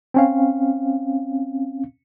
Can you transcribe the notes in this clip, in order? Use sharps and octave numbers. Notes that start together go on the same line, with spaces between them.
C4 C#4 F5